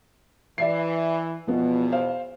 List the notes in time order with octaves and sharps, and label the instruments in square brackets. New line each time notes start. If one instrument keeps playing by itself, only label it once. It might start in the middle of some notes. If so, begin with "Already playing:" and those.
[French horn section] E3 [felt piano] D5 E5 C7
[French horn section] E2 B2 [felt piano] F3 B3
[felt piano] C5 F5